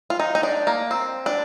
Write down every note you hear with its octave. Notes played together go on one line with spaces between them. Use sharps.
F4
D#4
D#4
D4
A#3
C4
D4